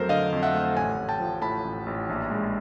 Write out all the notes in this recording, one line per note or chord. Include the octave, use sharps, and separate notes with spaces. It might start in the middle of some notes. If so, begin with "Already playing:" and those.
Already playing: F2 F#3 A3 A4 A#4 C5
D3 D#5 F5
F2
E5 F#5
A3
A1 F#5 G#5
A1
G5 A5
F3
A2 A5 B5
A1
A1
A#1
G#3